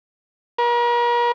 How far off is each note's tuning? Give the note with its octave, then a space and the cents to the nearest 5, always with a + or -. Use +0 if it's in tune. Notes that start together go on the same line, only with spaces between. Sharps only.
A#4 +40